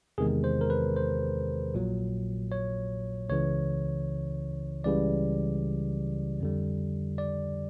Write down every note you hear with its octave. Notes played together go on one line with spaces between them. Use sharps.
E2 C3 D#3 G#3 G#4
C5
A#4
B4
C5
A#1 A#2 F#3
C#5
C#2 C#3 E3 C#5
C#2 C#3 E3 G3 D5
F2 D3 G3
D5